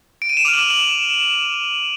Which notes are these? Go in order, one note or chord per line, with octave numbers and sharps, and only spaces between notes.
D7
D#7
E7
D6 F6 F7
F#7
F#7